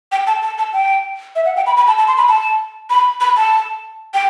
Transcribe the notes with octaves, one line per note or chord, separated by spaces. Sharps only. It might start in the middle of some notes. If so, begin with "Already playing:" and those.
G5
A5
A5
A5
G5
E5
F#5
G5
B5
B5
A5
A5
C6
B5
A5
B5
B5
A5
G5